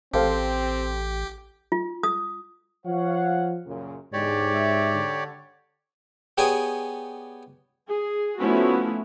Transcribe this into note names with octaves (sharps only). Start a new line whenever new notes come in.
A1 C4 G4 A4 C5 F5
F4
D#6
F3 C#5 F5 F#5
F#2 A#2 C#3
E2 G#2 D3 G#3 G4 C#5 D5
E5
D3
B3 G4 G#4 C#5 D5 G#5
G#4
F3 A3 B3 C#4 E4 F#4